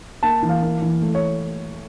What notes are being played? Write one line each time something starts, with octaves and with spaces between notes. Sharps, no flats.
A#3 A5
E3
F5
A#3
E3
A3
C#5